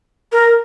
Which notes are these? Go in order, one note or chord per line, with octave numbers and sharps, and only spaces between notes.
A#4